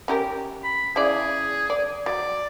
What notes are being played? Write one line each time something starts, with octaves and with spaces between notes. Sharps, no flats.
C#4 G4 A#4
B5
C#3 E4 G#4 D5
D5
F#3 D5